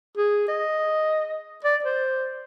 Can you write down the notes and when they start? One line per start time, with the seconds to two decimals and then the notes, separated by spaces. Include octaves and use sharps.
0.17 G#4
0.48 D#5
1.64 D5
1.84 C5